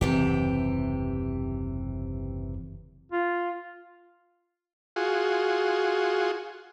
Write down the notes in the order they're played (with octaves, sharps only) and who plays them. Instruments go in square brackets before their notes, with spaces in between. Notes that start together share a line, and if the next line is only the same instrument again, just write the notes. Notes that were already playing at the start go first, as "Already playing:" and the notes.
[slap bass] F#1 D#2 [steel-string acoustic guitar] C3 E3 G4
[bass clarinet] F4
[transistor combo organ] F4 F#4 G#4